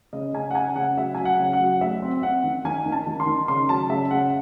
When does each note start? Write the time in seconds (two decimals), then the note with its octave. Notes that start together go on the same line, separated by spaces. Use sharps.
0.13 C#3 D#5
0.34 C#3 G#5
0.51 F#5
0.55 C#4 G#5
0.76 C#3 F#5
0.96 F#3 E5
1.15 F#3 G#5
1.25 F#5
1.39 C#3
1.53 F#5
1.60 F#3
1.81 A3 E5
2.02 C4
2.22 C4 F#5
2.44 D#3
2.65 D#3 G#5
2.86 D#3
2.92 A5
3.07 D#3
3.20 C6
3.27 D#3
3.48 C#3 C6
3.69 F#3 A5
3.90 C#3 E5
4.11 C#3 F#5